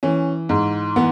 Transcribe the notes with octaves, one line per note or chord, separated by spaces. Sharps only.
E3 C#4
G#2
E3 B3